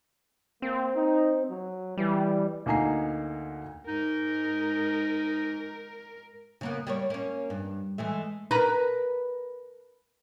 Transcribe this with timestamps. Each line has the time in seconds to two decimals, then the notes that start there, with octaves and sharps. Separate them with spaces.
0.62 A#3 C4
0.95 D#4
1.50 F#3
1.97 E3 G3
2.66 D2 A#3 D#4 G#5 A#5 C7
3.88 G#2 D#4 A#4
6.61 C#3 A#3 B3
6.87 G3 A#3 C#5
7.10 A#3 C#4
7.50 G2
7.98 E3 G#3 A3
8.51 A#4 B4